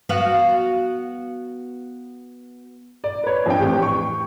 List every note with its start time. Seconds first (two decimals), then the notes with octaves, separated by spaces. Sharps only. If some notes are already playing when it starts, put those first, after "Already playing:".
0.09 B3 F#4 F5
3.04 D5
3.24 B4 C#5
3.46 F2 F3 C4 D4 G5
3.60 A1 G4 G5
3.82 C#6